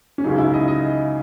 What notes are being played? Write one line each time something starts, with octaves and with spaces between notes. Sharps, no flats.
C#4
C#2 C#3 F#3 D#4
E4
D#5
D#5